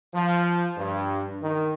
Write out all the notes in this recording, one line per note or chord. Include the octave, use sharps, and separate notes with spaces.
F3
G2
D#3